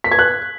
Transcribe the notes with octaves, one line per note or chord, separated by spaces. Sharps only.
B6
G#6
F#6